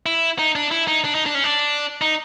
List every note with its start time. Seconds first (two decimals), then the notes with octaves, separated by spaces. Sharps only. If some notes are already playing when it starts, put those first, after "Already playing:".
0.06 E4
0.39 D#4
0.56 D4
0.71 E4
0.88 D#4
1.04 D4
1.15 D#4
1.26 D4
1.35 C#4
1.44 D4
2.02 D#4